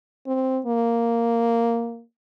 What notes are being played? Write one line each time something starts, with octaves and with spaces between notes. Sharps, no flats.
C4
A#3